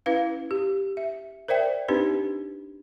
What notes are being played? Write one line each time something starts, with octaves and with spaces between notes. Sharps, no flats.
C#4 E4 B4 F5
G4
E5
A#4 C5 D5 E5 G5
C4 D4 D#4 G4 B4